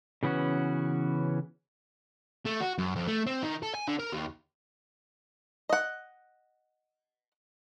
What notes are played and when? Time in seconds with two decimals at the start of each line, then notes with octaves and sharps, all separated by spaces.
0.23 C#3 E3 B3 C#4 F#4
2.46 A3
2.61 F#4
2.78 F#2
2.96 F2
3.07 A3
3.27 C4
3.43 D#3
3.63 A4
3.75 G#5
3.88 D3
4.00 A#4
4.13 D#2
5.69 D#5 F#5